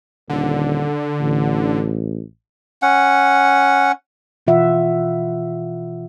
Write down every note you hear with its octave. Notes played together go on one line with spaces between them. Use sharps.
D#1 D3
A1
C#4 F#5
B2 E3 F4 E5 F#5